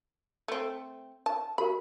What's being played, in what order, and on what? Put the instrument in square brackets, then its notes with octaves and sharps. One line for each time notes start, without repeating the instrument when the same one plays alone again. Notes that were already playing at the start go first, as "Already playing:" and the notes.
[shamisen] A3 C4
A5
[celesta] F#4 G4 A#4 [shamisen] B5